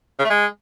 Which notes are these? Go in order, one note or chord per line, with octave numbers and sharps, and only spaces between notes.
C#3
A3
G#3